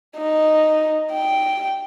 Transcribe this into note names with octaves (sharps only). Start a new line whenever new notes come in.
D#4
G5